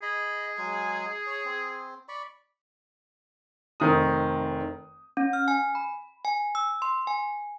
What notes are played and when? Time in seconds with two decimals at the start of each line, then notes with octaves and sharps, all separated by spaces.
0.02 G#4 D#5 B5
0.58 F#3 G#3 G#5
1.27 C#5
1.45 C4
2.08 D5 B5 C#6
3.80 F1 D#3 C4 D#6
5.17 C#4
5.33 F6
5.48 G#5
5.75 B5
6.25 G#5
6.55 E6
6.82 C6
7.07 G#5